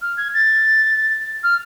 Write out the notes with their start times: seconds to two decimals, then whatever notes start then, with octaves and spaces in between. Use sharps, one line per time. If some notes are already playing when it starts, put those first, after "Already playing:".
0.02 F6
0.17 G#6
0.34 A6
1.43 F6